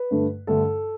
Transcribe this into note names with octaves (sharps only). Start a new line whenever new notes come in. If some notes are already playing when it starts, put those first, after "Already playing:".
Already playing: B4
G2 D3 A3
G2 D3 A3 A4